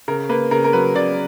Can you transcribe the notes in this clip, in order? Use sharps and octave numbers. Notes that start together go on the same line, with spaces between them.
C#3 A#4
A#3 B4
C#3 A#4
A#4
F#3 B4
C#3 D5